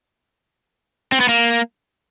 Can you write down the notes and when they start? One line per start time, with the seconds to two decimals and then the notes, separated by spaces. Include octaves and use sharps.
1.12 C4
1.20 B3
1.29 A#3